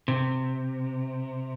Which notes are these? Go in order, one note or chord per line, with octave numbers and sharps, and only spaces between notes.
C3